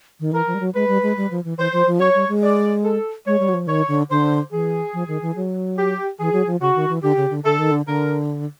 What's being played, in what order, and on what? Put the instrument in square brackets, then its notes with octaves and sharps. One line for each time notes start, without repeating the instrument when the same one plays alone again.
[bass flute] D#3
[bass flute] E3 [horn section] A#4
[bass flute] F3
G3
F#3
[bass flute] G#3 [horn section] B4
[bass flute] G3
G#3
G3
F3
E3
[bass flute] E3 [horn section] C5
[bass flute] F3
F3
[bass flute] F#3 [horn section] C#5
[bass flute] G3
G#3
[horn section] D5
A4
[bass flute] G#3 [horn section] C#5
[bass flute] G3
F#3
F3
[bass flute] D#3 [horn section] C#5
[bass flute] D3
[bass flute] D3 [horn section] C5
[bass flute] E3 [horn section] G#4
[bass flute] F3
D#3
E3
F#3
[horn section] G4
[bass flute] E3 [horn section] G#4
[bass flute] F#3
F3
[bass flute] C#3 [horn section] F#4
[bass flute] D#3
E3
[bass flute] D3 [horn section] G4
[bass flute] C#3
D3
[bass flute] D3 [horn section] A4
[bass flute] D#3
D3
[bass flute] D3 [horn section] A#4